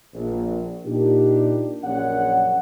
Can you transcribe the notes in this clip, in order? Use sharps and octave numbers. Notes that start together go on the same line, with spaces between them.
A#1
A#2 D4 D#4 G4
A#1 F#2 C#5 D5 F#5